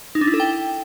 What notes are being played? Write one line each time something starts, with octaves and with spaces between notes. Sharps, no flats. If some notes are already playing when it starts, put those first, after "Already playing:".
D#4
D4
E4
A4
G5